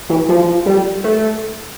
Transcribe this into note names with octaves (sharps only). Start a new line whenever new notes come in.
E3
F3
G3
A3